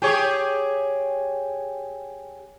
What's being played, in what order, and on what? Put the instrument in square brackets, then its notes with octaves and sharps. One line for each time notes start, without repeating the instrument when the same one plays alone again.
[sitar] G4 G#4 C#5